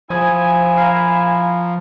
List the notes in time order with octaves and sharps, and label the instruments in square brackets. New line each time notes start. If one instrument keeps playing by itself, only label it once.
[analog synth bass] F3 [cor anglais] E4 [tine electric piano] C5 D#6 G#6 [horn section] G#5
[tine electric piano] F5 A#5